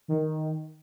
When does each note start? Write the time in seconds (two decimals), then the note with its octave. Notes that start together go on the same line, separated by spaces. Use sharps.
0.08 D#3